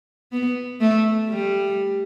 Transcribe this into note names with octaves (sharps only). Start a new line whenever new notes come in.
B3
A3
G3